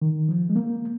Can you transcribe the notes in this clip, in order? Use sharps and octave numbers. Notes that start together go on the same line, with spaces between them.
D#3
F3
G#3
A#3